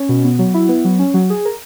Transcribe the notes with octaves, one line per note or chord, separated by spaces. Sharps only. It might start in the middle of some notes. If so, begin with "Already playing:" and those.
Already playing: C#4
B2
B3
F#3
E4
B3
F#3
C#4
F#3
G#4
A#4